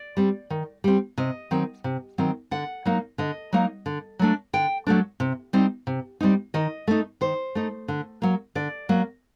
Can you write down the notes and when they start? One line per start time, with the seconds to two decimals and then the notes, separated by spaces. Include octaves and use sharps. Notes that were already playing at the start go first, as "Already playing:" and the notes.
Already playing: D5
0.17 G3 C4
0.50 D#3
0.84 G3 C4
1.18 C3 D#5
1.51 D#3 F#3 C4
1.84 C3
2.18 D#3 F#3 C4
2.51 D3 F#5
2.85 F#3 A#3 D#4
3.18 D3 D#5
3.53 F#3 A#3 D#4
3.86 D3
4.19 F#3 A3 D4
4.53 D3 G5
4.87 F#3 A3 D4
5.20 C3
5.53 G3 C4 D#4
5.87 C3
6.21 G3 C4 D#4
6.54 D#3 D#5
6.87 A3 D#4
7.21 D#3 C5
7.55 A3 D#4
7.88 D3
8.22 F#3 A#3
8.55 D3 D5
8.89 F#3 A#3